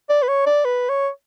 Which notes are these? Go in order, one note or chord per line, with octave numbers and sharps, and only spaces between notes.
D5
B4
C#5
D5
B4
C#5